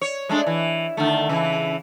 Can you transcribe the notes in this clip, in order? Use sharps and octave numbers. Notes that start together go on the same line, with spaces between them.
C#5
G#3 A3 D4
E3
D3 D#3 A3
C#3 E3